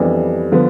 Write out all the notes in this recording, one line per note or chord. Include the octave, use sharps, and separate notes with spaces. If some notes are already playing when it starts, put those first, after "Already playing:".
Already playing: F2 E3 G3 B3 D4
D3 F3 B3